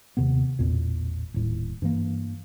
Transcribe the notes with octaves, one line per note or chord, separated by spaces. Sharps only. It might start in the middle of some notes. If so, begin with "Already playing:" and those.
D#2 C3 D#3 B3
A1 E2 A#2
D#1 A2
G2 E3 A#3